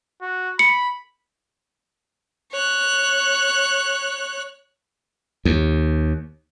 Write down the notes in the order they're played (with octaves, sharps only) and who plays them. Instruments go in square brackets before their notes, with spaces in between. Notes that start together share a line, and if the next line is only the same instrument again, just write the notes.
[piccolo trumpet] F#4
[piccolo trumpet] B5 [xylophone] C#7
[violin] C#5 F#6
[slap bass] D#2